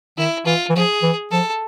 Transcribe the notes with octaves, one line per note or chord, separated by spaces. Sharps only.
D#3 E4
E3 F4
E3
F3 G#4
E3
F3 A4